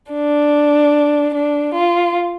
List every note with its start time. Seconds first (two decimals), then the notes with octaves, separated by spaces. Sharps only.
0.13 D4
1.34 D4
1.74 F4